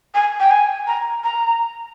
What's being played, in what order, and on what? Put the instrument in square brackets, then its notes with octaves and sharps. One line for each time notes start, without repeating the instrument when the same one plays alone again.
[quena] G#5
G5
G#5
A#5
A#5